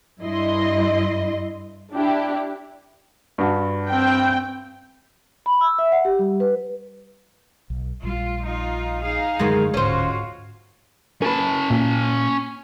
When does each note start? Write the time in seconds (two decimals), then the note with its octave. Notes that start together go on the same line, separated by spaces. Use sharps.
0.21 G2 E4 D#5 C6
1.94 D4 E4 G4
3.38 G2 F#4 A5
3.89 C4 G5
5.46 B5
5.61 E6
5.78 E5
5.92 F#5
6.05 G4
6.19 G3
6.40 B4
7.70 B1
8.04 A#1 G3 F4
8.41 D#4 F4
9.03 D#4 G#4 F5
9.39 F#2 D3 D#3 G#3
9.74 D1 G#2 D3 C#4 F4 F#4 C5
11.22 C#4 A#4 B4 A5
11.70 A#2